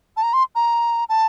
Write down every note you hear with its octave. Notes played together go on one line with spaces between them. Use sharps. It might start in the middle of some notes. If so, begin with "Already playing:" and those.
A5
A#5
C6
A#5
A5